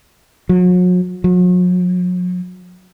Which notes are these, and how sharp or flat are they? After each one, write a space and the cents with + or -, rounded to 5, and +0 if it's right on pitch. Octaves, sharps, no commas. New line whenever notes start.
F#3 -40
F#3 -45